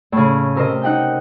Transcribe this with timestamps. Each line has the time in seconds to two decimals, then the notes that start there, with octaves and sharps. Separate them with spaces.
0.12 A2 C#3
0.55 C3 A#4 C5 D#5
0.82 D#4 F#5 G5 G6